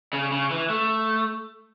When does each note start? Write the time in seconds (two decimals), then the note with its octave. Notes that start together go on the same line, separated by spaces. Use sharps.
0.13 C#3
0.32 C#3
0.51 E3
0.70 A3